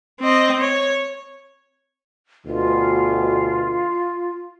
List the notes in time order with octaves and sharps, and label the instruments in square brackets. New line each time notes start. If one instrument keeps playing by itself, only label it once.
[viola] C4 D#5
C#5
[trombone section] D2 B2 [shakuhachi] F4